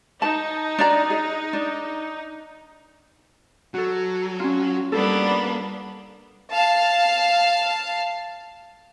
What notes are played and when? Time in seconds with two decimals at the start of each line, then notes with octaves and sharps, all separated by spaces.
0.22 D#4 A5
0.79 D4 D5 A#5
1.10 G#4
1.53 D4
3.74 F#3 F#4 A4
4.40 C#4 F4
4.92 G3 A#3 B3 D4 A4
6.50 F5 A5